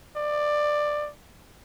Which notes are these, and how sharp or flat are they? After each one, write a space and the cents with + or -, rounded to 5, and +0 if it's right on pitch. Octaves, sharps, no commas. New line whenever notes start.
D5 +15